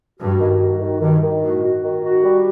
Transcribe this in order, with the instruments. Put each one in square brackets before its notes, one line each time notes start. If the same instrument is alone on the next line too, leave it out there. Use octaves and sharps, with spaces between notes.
[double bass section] G2 [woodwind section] F#4
[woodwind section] D#3
F#4
D#3
[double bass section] G2 [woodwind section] D#3
[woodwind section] D#3
[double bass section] A2 [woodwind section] F#4
[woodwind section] F#4
D#3
F#4
G3